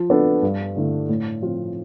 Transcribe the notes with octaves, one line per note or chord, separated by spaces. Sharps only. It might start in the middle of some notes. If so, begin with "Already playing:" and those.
Already playing: F3
B3 D4 A4
G2
D3 A3 E4
A2
F3 C4 F4